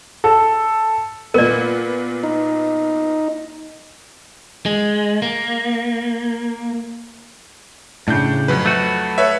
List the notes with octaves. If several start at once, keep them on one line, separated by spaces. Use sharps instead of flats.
A4
A#2 B3 A#4 D5
D#4
G#3
A#3
A2 C#3 D4 G6
F2 F#3 B4
A3 F#4
B4 C#5 E5